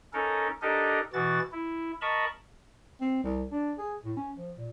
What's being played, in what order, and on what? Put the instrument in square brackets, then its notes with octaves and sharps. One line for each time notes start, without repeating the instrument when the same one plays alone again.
[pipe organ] C#4 D#4 A4 A#4
D4 D#4 G4 A4 A#4 D#5
B2 E3 F#4 A6
E4
A#4 D#5 A5 B5 C#6
[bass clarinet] C4
C2
D4
G#4
A2
C#4
F3
A#2